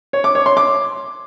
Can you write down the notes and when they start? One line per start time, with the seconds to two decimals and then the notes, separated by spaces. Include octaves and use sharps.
0.13 C#5
0.24 D6
0.35 C#5
0.46 C6
0.57 D6